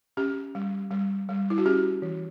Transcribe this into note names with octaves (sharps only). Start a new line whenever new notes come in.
C#4 G4
G3
G3
G3
E4
F#4
C#4 G4
E3